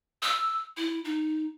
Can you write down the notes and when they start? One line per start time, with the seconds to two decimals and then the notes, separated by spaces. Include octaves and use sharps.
0.23 E6
0.77 E4
1.05 D#4